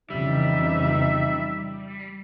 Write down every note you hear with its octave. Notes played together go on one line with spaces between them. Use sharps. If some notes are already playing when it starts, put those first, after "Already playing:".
F2 C#3 E3 G3 D#4 E5